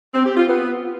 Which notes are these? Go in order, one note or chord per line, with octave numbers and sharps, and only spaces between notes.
C4
G4
F4
B3